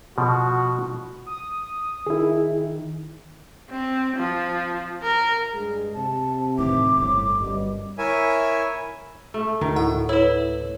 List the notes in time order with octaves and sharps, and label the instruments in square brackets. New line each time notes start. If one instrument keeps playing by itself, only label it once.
[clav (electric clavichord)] B2 F3 [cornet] F#4
[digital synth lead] D#6
[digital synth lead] D#3 [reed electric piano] E4 G#4
[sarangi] C4
F3
A#4
[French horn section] G2 G#3 [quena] G#4
[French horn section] C3 [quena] A5
[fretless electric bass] A2 D#3 E3 [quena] D6
[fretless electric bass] G1 A2
[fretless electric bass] G1 G3 [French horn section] F#2 B3 D#5
[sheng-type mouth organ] E4 A#4 C#5 E5 G#5
[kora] A3
[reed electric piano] D2 [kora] D#3
[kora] A2 [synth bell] F#5
[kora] E4 [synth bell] B4 C#5